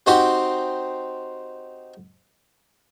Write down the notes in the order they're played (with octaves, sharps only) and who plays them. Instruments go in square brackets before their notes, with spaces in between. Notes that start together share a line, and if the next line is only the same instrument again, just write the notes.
[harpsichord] C4 D#4 F#4 G4 C5 C6